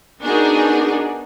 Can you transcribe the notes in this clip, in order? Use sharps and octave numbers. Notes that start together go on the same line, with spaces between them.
B3 D4 D#4 F#4 G#4 A#4